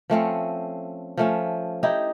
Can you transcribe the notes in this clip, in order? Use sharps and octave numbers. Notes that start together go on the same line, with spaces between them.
F3 A3 C4 C#4
F3 A3 C#4
D#4 E4 G4